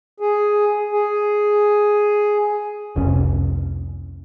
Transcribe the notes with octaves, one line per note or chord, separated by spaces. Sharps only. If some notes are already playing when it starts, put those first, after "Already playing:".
G#4
G#4
F1 C2 C#4